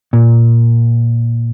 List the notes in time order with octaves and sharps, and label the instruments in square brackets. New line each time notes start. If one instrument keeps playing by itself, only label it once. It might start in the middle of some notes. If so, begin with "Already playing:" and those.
[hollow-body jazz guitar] A#2